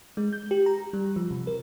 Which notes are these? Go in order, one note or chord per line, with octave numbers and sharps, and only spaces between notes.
G#3
G6
G4
A#5
G3
F3
C3
A#4